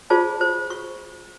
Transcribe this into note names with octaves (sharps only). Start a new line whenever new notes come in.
F4 G#4 C5 D5 A5
C5
C#6